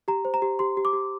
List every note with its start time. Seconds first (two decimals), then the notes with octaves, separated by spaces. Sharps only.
0.08 G4 A#5
0.25 C5
0.34 A#5
0.42 G4
0.59 G4 C6
0.77 G4
0.85 D6
0.93 G4